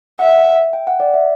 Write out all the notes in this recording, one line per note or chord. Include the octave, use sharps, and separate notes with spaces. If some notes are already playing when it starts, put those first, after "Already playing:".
E5 F#5
G5
F#5
D5
E5